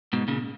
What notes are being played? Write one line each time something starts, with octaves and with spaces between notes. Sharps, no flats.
G#2 B2
A#2 C#3